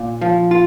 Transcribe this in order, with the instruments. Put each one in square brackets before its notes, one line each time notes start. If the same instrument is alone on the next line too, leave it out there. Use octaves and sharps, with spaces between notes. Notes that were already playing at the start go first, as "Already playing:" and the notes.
Already playing: [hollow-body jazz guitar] A#2
F3
F4